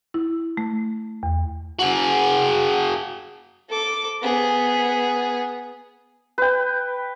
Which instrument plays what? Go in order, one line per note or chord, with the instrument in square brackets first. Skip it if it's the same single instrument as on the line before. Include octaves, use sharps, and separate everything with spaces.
[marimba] E4
A3
E2
[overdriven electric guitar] F#4 G#4
[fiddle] A4 D6
B3 G#4
[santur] B4 G5